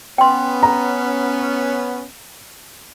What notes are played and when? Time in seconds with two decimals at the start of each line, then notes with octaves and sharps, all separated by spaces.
0.18 B3 C#4 G5 C6
0.63 A#5